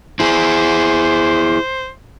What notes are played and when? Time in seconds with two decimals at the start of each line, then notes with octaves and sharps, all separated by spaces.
0.20 E4 G#4 C5